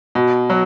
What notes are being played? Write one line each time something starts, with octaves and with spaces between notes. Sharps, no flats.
B2
F#3